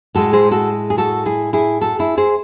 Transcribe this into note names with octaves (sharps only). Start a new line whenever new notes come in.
A2 G#3 F#4 A4
G#4 C5
F#4 A4
G#4
F#4 A4
E4 G#4
E4 G#4
F#4 A4
E4 G#4
G#4 C5